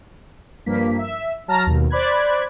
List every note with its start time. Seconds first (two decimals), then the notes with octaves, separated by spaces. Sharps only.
0.66 G2 F3 A#3 B6
0.99 E5
1.48 F#3 A5 A#5 F6 A#6
1.66 D#2 B2
1.90 C5 D5 B5 F#6 G#6